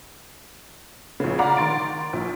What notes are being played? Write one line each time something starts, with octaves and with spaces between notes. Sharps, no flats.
A#1 C#3
D5 F5 F#5 A#5 B5 D6
D#3 C6 A6 D7
A#1